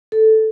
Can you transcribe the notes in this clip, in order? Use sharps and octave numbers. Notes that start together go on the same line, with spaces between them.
A4